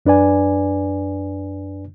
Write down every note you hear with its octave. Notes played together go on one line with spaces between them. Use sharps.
F#2 D4 B4 D5 G#5